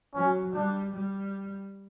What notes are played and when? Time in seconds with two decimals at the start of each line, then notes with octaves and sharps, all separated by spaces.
0.15 F#3 C#4
0.54 G3 D4
0.94 G3